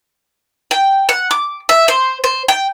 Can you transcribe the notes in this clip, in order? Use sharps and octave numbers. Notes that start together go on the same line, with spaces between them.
G5
F#5
D6
E5
C5
C5
G5